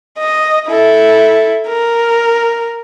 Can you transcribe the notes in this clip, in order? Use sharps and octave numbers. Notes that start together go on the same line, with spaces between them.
D#5
E4 A4
A#4